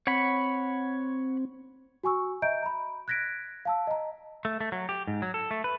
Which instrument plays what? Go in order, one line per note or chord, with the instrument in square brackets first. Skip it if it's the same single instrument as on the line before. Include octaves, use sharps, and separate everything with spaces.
[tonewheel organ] C4 [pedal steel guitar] C#5 F#5 B5
[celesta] F#4 G#5 C#6 E6
D#5 E5 A#5 G6 D7
A#5 B5
F#6 G#6 A#6 B6 D7
F5 A5 E6
D#5 A#5
[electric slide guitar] A3
A3
F#3
G4
G#2
F#3
A4
A3
B4